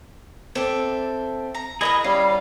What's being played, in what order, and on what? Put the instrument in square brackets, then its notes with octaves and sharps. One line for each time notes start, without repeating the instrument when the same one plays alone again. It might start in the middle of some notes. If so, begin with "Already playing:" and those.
[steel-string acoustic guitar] C4 [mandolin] A4 D5 E5
[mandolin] A#5
[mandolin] E4 A#4 B4 [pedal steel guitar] G#4 D#5 D#6
[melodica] G3 [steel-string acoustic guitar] C#4 [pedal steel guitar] F5